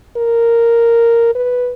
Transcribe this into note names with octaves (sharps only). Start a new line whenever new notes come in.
A#4
B4